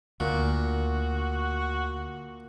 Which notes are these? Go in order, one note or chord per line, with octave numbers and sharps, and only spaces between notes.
D2 A#2 F#4